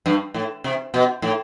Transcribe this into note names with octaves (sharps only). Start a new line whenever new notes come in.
G2
A2
C3
B2
A2